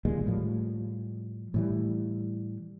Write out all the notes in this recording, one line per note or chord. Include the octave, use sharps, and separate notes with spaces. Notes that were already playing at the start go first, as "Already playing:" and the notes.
D1 D#2 A#2 G#3
A2 F3 G3
A2 E3 G3